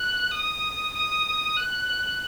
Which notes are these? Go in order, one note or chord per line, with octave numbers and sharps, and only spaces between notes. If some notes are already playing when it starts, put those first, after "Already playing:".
Already playing: F#6
D#6
D#6
F#6